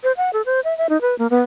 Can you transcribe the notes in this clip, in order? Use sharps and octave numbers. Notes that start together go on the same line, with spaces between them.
C5
F#5
A4
C5
E5
E5
D#4
B4
A#3
B3